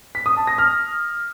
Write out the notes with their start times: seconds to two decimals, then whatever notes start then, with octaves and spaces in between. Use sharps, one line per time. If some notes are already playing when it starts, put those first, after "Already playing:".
0.15 B6
0.26 D#6
0.37 A5
0.47 A#6
0.58 F6